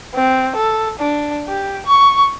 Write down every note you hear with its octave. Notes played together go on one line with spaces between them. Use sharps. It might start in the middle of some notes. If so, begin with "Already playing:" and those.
C4
A4
D4
G4
C#6